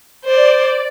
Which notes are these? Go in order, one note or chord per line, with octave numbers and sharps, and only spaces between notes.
C5 D5